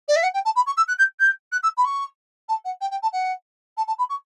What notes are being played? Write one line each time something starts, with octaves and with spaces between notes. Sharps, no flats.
D5
E5
F#5
G5
A5
B5
C#6
E6
F#6
G6
G6
F#6
E6
B5
C#6
A5
F#5
G5
G5
A5
F#5
A5
A5
B5
C#6